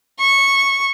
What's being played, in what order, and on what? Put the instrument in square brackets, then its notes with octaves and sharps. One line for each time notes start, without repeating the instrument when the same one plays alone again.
[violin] C#6